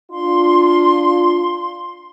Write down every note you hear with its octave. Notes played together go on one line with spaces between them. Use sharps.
D4 F4 C6